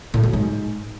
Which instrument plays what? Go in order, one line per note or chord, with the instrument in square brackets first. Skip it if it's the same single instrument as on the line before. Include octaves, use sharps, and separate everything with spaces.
[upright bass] A2
F#3
G#2